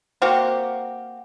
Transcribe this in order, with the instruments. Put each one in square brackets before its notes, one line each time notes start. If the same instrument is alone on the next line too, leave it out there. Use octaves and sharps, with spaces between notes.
[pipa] A#3 C4 F#4 G4